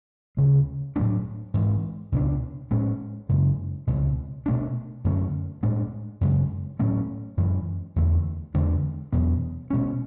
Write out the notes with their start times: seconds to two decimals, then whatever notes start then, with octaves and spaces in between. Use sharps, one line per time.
0.37 D2 C#3 G#3
0.96 A2 F#3 A3 D4
1.54 G#2 E3 G#3
2.12 C#2 B2 A3 D4
2.71 A2 G#3 C#4
3.29 F#2 C#3 G#3
3.87 C#2 B2 G#3
4.46 B2 A3 D4
5.05 F#2 D3 A3 C#4
5.63 A2 G#3 D4
6.21 F#2 C#3 G#3
6.79 A2 F#3 A3 C#4
7.37 F#2 E3 G#3
7.96 E2 D3 A3
8.54 E2 D3 G#3 D4
9.13 E2 B2 F#3 B3
9.70 B2 G#3 C#4